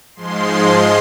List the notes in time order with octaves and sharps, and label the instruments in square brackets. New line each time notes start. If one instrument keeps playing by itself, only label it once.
[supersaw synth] G#2 F3 G#3 C6